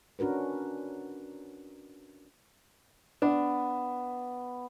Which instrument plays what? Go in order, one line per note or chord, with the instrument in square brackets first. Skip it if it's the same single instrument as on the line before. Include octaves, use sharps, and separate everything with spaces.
[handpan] C#4 D4 F#4 A#4 B4
[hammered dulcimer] B3 [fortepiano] D4